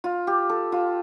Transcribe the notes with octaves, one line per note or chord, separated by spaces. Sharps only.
F4
G4
A4
F4